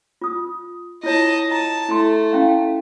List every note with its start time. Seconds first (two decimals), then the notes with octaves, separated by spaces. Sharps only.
0.22 F4 D#6
1.04 E4 F4 C#5 D#5 A5
1.51 A5 A#5
1.89 A3 E4 C6
2.33 C#4 E4 F5